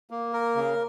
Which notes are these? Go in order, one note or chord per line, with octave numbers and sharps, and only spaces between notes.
A#3
A#4
C#3